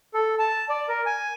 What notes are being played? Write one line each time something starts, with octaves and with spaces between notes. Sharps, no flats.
A4
A5
D5
A#4
G#5